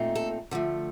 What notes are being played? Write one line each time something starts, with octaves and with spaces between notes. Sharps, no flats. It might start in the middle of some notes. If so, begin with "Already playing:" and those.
Already playing: A#2 A3 C4 D#4
A4
D3 F3 A3